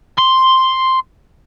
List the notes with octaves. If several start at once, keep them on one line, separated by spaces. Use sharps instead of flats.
C6